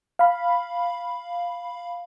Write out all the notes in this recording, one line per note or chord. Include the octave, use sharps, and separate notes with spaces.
F5 B5